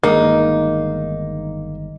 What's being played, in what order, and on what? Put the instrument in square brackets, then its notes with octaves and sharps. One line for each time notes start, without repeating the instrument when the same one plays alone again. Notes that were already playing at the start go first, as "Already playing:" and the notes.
[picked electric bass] G1 D#3 G#3 [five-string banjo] A#3 [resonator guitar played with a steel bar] D#4